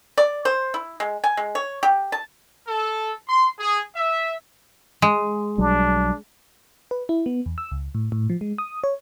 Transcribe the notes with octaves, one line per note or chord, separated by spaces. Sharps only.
D5
C5
E4
G#3
G#5
G#3
C#5
G4
A5
A4
C6
G#4
E5
G#3
B1 F#3 G3 D4
B4
E4
B3
E2
E6
C#2
A2
A2
F3
G#3
D#6
C#5